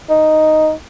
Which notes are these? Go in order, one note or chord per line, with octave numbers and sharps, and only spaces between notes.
D#4